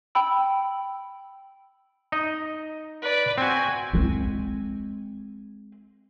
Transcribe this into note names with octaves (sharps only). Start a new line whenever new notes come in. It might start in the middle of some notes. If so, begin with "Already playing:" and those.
G5 B5 E6
D#4 D#5
B4 D5
C4 F#4 G#5
G#3 C4